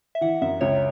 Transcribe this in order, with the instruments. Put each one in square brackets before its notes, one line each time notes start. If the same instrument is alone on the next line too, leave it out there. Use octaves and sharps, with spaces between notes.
[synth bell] E5
[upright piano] E3 [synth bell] F#5
[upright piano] F#2 [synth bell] E5
[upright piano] C#2 [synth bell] C#5